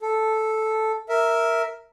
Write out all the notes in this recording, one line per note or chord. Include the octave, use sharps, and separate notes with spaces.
A4
A#4 E5